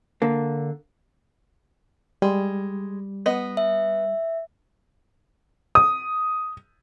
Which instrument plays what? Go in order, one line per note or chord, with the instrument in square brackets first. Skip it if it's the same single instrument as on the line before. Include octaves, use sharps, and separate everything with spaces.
[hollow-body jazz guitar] D3 A#3
[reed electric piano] G3 [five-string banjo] G#3
[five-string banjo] B3 D#5
[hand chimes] E5
[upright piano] D#6